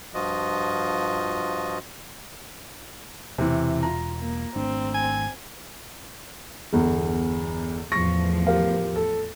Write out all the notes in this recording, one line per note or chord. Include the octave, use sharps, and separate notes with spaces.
G2 F3 F4 F#4 D#5
E1 C3 E3
F4 A#5
A#3
G#1 A3 C4 D4
G#5
G1 E2
E2 A2 F3 C#6 A#6
G4 A#4 F5
A4